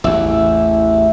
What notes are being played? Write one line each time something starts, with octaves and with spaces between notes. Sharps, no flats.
A1 E2 E5